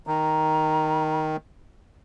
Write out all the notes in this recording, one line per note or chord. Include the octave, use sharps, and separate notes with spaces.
D#3 A#5